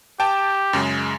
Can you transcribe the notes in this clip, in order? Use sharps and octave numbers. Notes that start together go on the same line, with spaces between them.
G4 G5 A5
F#2 C#3 G#3